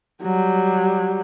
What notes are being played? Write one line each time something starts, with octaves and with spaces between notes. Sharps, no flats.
F#3 G3